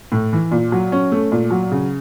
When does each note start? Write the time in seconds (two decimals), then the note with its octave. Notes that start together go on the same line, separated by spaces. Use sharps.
0.12 A2
0.33 E3
0.51 A#2
0.72 F#3
0.92 C#4
1.12 A3
1.32 A#2
1.50 F#3
1.72 C#3